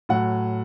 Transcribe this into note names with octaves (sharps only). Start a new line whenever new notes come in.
A2 F#3 F#5